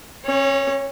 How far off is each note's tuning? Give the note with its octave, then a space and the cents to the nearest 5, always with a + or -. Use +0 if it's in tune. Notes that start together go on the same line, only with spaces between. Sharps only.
C#4 -35 C#5 +0